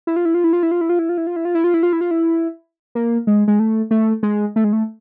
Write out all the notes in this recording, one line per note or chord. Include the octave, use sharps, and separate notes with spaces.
E4
F4
E4
F4
E4
F4
E4
F4
E4
F4
E4
F4
E4
F4
E4
F4
E4
F4
E4
F4
E4
F4
E4
A#3
G#3
G#3
A3
A3
G#3
A3
G#3
A3